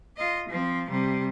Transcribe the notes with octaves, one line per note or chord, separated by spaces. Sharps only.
F4 D#5
F3 C4
C3 G3